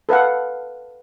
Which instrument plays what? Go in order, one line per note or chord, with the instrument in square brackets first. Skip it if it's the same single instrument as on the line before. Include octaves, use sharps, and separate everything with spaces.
[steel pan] A4 B4 F5 F#5